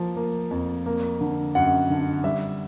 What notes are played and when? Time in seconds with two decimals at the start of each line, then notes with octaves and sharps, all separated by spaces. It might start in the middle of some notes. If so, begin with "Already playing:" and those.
Already playing: F3 A#3
0.17 A#3
0.51 F2
0.86 A#3
1.21 D3
1.55 F#2 F#5
1.90 D3
2.24 G3 E5